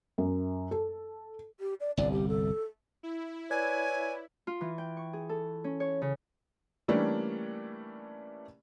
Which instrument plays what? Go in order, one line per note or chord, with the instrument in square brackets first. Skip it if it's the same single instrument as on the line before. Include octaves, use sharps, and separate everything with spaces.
[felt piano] F#2
A4
[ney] G4
D5
[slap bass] G1 C2 [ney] D5
[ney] G4
A4
[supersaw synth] E4
[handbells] B4 D5 G#6 [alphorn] C#5 [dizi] G#5
[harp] F4
E3
G5
C#6
G#4
A4
C#4
C#5
C#3
[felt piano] E3 G3 A3 A#3 C#4 D4